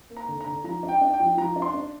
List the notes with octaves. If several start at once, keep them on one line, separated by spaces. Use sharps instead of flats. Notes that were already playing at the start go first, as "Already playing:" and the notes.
A#3
A#5
D3
A#5
D3
F3 A#5
D4
G5
D4
G5
F3
F3 A#5
D4
C6
D4